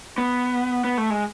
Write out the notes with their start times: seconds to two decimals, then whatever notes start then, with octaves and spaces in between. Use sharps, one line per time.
0.18 B3
0.84 B3
0.98 A3
1.10 G#3